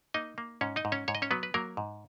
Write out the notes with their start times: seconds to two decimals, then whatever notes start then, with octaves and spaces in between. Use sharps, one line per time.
0.14 A#3 D#4 D#5
0.38 A#3
0.61 G#2 C#4 C#5
0.76 D#4 D#5
0.85 G#2
0.92 C#4 C#5
1.08 G#2 C#5
1.15 D#5
1.22 C#4 C#5
1.31 F#3 B3 B4
1.43 B4
1.54 F#3 A#3 A#4
1.77 G#2